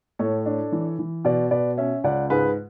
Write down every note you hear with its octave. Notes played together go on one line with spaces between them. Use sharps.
A2 A4 C#5
D4
E3
E3
B2 B4 D5
B2 B4 D5
C#4 C#5 E5
C#2 D5 F#5
G#2 G#4 B4